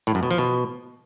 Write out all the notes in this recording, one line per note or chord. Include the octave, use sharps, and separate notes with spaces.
A2
F#2
B2
F3
B2